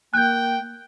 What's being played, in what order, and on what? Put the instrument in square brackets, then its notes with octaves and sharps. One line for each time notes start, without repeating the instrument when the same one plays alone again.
[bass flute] A#3 [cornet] G5 [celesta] F#6 G6